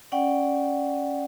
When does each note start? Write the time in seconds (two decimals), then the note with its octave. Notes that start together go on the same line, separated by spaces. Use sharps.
0.12 C#4 D5 F#5 G5